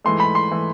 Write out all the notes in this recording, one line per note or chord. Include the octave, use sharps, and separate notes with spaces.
G#2 E3 A3 C6
B5
C6
E3 A3